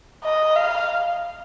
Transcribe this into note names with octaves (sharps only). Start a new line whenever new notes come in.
D#5
F5